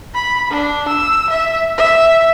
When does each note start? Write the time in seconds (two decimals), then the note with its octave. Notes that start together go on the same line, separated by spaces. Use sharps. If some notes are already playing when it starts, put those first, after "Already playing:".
0.15 B5
0.51 D4
0.88 E6
1.30 E5
1.78 E5